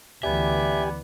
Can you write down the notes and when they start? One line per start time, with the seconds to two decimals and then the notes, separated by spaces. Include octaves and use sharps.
0.23 D2 E3 B3 G4 D5 E5 G#5